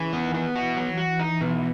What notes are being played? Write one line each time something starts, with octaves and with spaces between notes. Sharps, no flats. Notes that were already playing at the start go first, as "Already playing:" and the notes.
Already playing: C#3 E3
B3
D#3
B3
E3 F#4
F#3
E3
F#4
D#4
B2